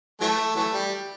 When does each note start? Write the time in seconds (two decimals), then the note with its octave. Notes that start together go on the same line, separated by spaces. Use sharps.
0.21 E3 F#3 A3
0.56 E3 F#3 A3
0.73 G3